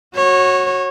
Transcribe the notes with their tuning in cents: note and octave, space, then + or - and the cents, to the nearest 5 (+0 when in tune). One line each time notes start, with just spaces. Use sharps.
F#4 +0 C#5 -20